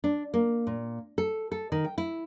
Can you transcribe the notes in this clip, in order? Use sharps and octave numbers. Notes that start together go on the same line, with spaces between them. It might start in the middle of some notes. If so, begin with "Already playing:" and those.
D4
A#3
A#2
A4
A4
D#3
G5
E4